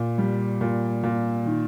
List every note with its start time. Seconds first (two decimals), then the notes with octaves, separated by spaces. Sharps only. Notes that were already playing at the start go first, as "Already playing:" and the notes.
Already playing: A#2
0.18 G3
0.61 A#2
1.03 A#2
1.46 D#3